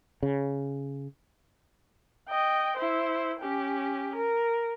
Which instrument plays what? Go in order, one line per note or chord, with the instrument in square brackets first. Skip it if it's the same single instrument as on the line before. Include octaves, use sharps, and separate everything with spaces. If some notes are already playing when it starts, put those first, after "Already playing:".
[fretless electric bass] C#3
[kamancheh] D#5 G5
E4 C5
C#4 G4
A#4